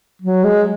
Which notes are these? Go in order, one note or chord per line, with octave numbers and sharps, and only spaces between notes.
F#3
G#3